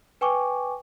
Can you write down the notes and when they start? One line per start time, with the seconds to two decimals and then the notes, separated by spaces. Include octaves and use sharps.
0.21 B4 G5 G#5 C#6 D6